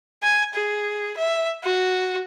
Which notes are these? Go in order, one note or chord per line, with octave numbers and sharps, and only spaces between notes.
G#5
G#4
E5
F#4